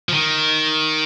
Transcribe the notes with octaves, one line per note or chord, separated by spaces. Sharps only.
F3
D#3